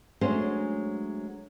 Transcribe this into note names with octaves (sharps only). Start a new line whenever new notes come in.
F#3 G#3 A3 C#4 D4 C5